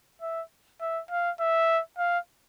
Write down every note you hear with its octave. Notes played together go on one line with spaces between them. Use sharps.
E5
E5
F5
E5
F5